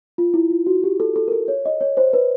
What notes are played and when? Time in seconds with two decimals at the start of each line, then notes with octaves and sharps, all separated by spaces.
0.18 F4
0.34 E4
0.51 F4
0.67 F#4
0.84 G4
1.00 A4
1.16 A4
1.28 A#4
1.32 A4
1.48 C#5
1.65 D#5
1.81 C#5
1.97 C5
2.13 B4